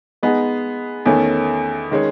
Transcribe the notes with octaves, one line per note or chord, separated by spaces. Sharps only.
G#3 B3 D#4 G#4
E2 D#3 A3 C#4
D#3 G#3 C#4